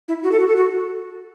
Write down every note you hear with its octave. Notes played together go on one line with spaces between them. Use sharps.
E4
F#4
A4
F#4
A4
F#4